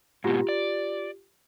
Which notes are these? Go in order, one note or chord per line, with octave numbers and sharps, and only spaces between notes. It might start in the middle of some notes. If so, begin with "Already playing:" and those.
G#2 B2 F4 G4
D5